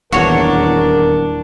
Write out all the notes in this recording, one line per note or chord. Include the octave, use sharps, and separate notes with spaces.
D#1 E2 D4 F#4 A#4 C#5